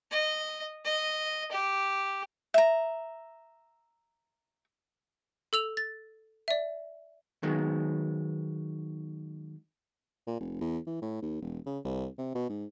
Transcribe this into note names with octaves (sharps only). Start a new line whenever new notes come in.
D#5
D#5
G4
E5 A#5
A4 E6 F7
A6
D5 E5
D#3 F#3 G#3 B3
A#2
F1
E2
E3
A2
D#2
E1
C#3
C2
C3
B2
G#2